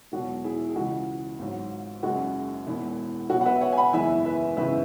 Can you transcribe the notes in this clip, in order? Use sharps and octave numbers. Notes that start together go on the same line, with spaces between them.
E1 E2 B2 F#3 F#4
E4 G#4
G#4
C#2 C#3 E3 G#3 F#4
G#1 G#2 F#3
F#1 F#2 C#3 G#3 F#4
E1 E2 E3
B1 B2 F#3 F#4
F#5
B4 E5
C#5 F#5
G#5
F#5 B5
F#1 E2 E3 G#3 E5 G#5
B4 E5
G#1 F#2 C#3 E3 G#3 B4 E5